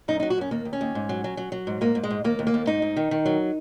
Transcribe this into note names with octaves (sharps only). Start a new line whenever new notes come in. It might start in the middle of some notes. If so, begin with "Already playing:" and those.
F#2 D#4
D#4
F#3
F#4
F#2 C#4
D#2 A#3
D#2
C#4
D#2
G#2
F#3
F#3
F#3
F#3
G#2
G#2 A#3
G#2
G#3
G#2
D#2 A#3
D#2
A#3
D#2
G#2 D#4
G#2
D#3
D#3
F#3